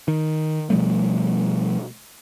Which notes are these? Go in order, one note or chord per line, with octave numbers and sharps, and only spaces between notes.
D#3
B2 F3 G3 A3